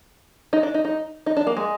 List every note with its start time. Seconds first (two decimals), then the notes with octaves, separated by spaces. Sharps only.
0.53 D#4
0.63 D4
0.74 D#4
0.85 D#4
1.26 D#4
1.37 D4
1.47 A#3
1.57 G#3